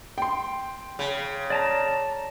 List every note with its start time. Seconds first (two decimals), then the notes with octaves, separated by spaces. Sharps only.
0.18 G5 C6
0.99 C#3
1.50 D5 A5 A#5